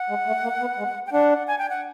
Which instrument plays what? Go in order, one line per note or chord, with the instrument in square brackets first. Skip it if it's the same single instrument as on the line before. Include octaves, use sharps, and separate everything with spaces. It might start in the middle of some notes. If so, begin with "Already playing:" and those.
Already playing: [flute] F#5
[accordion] G#3
A3
A#3
B3
G#3
[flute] G5
[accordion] D4 [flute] F#5
[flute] G#5
G5
F#5